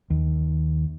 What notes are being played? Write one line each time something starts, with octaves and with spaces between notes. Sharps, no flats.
D#2